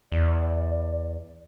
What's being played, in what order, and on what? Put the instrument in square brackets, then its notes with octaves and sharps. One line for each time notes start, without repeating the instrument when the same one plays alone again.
[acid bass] E2 [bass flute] D5